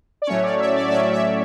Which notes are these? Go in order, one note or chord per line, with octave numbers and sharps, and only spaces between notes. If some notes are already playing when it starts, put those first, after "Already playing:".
D5
A2 F#3 A3 C#4 C#5
D5
E5
D5
D5
A2 F#3 A3 C#4 E5
E5